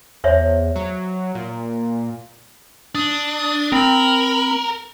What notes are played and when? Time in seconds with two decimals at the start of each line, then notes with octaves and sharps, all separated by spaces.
0.24 E2 C5 C#5 E5
0.76 F#3
1.35 A#2
2.95 D4 D#6
3.72 C4 A#4 B5